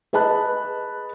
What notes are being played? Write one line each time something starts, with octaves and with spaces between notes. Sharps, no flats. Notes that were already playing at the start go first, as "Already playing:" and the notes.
G#4 B4 D#5 A5 B5 F#6